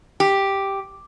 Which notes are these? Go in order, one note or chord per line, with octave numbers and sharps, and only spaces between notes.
G4